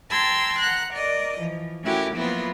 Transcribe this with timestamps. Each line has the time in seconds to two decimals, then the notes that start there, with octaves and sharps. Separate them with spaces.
0.11 G5 A5 A#5 C6 E6 G#6
0.60 F#5 A#5 F#6
0.93 A#4 D5 D#5
1.38 E3 F3
1.83 A3 C#4 E4 F#4 G4 A#4
2.15 F3 F#3 A#3 B3 E4 F4